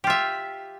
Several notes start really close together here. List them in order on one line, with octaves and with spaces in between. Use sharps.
G4 F4 E5